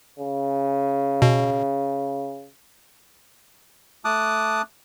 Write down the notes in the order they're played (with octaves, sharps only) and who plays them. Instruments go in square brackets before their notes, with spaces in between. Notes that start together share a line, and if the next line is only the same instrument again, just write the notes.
[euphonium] C#3
[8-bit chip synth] B2
[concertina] A3 A5 D6 D#6 F#6